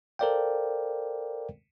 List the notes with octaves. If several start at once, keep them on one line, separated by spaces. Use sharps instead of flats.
A4 A#4 C5 D5 F5 G5